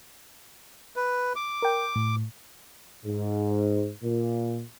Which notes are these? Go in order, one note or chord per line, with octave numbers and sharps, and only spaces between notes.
B4
D6
A#4 G5
A2
G#2
A#2